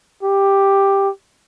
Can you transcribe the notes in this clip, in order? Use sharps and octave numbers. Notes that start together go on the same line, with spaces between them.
G4